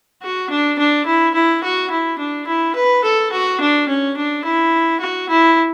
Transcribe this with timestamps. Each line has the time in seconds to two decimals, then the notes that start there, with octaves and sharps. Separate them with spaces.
0.22 F#4
0.50 D4
0.78 D4
1.06 E4
1.34 E4
1.63 F#4
1.90 E4
2.18 D4
2.47 E4
2.75 B4
3.04 A4
3.32 F#4
3.60 D4
3.88 C#4
4.16 D4
4.44 E4
5.00 F#4
5.29 E4